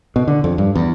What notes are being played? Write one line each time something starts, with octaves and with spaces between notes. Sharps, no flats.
B2
D3
F2
G2
E2